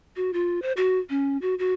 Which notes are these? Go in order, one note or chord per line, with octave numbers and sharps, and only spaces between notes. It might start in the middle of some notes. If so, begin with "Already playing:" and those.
F#4
F4
C5
F#4
C#4
F#4
F#4